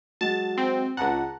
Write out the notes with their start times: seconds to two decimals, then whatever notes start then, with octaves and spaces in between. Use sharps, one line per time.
0.21 F#3 G#3 A5
0.58 C4
0.97 C#2 F#5 A5 A#5